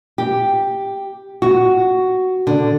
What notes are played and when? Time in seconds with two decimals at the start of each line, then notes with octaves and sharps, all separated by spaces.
0.18 G4
1.42 F#4
2.47 D3